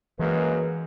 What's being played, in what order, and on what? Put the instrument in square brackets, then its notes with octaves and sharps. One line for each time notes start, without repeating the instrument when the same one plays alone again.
[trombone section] F#2 G#3 A#3 [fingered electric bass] E3 [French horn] B4